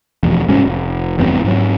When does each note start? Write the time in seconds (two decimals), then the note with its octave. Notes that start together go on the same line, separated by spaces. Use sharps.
0.23 E1 A1 F2
0.48 F#1 C2 G#2 C#4
0.65 F1
1.18 F#1 E2 G2 C4
1.44 G#2 F#3